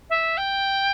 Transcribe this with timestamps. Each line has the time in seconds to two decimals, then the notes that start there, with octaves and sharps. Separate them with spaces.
0.09 E5
0.37 G5